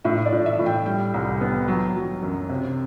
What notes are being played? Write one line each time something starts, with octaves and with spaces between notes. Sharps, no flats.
A2 E5
D5
A2
E5
A2
G5
G3 G5
C2
B3
F#3
F#3
F#2
C3